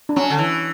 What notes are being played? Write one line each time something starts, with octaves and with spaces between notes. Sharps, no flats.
D4
F#3 C#4
D3
E3